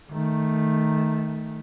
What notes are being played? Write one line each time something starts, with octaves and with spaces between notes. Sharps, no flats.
D#3 A3